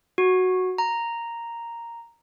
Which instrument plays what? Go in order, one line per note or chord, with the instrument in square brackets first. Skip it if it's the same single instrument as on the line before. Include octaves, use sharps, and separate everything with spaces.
[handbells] F#4
A#5